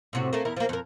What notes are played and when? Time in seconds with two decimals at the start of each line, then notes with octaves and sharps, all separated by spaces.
0.13 A2 C3 F#4
0.33 A3 A#3
0.45 E2 E4 A#4
0.57 F3 A#3
0.69 F2 A#4